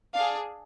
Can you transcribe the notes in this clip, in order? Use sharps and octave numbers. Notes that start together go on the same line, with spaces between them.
D4 G#4 F5